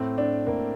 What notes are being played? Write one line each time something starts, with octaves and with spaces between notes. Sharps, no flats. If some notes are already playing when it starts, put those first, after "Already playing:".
Already playing: A2 C4
D4
A2 A#3